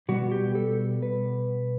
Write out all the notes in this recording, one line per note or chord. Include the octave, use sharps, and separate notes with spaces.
B2 G3 B3 F#4
G4
A4
B4